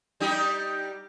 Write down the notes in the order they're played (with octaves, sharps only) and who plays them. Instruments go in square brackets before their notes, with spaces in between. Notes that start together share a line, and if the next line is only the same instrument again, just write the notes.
[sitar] G3 D#4 G4